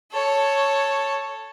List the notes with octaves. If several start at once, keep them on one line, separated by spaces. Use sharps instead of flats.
A4 C#5